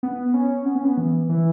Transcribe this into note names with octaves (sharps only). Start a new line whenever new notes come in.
B3
C#4
B3
C#4
B3
E3
E3